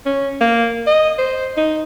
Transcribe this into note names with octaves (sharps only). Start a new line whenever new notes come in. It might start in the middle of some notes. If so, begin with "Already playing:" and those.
C#4
A#3
D#5
C5
D#4